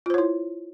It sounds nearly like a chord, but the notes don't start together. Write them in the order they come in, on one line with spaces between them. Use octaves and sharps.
F4 C5 C#5 E4